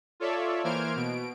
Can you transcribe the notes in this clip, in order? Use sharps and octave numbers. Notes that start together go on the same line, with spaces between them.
F4 A4 C#5 D5 E5
E3 A#3 C5 F6 G#6 D7
B2 D7